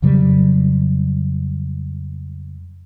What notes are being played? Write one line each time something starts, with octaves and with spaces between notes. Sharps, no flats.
F2 C#3 F#3 G3